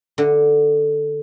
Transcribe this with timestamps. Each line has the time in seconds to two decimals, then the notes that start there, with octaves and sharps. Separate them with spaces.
0.18 D3